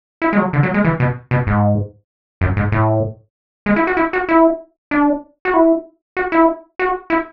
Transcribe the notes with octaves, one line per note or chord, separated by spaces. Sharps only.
E4
G#3
F#3
D3
F#3
G#3
E3
B2
B2
G#2
F#2
G#2
A2
G#3
E4
F#4
E4
F#4
E4
D4
F#4
E4
F#4
E4
F#4
E4